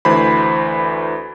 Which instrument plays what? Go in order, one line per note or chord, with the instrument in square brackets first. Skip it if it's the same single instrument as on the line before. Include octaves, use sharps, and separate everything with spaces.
[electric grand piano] D2 E3 C5 B5